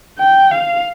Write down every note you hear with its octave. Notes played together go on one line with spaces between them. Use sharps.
G5
F5